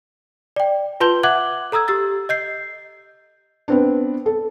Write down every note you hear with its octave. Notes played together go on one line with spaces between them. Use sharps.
D5 G5
F4 B4 A5 C6 G6 G7
E5 F#5 D6 F#6 G#6 F#7
A4 A#5 D#6 E6 G#6
G4 E6 A6
D#5 G6 C7
B3 C4 D4
A4